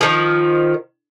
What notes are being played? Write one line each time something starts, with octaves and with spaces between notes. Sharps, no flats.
D#3 F3